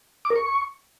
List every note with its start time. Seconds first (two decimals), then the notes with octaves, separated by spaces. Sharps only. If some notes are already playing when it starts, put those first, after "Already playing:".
0.25 D6
0.30 A#4
0.36 C#6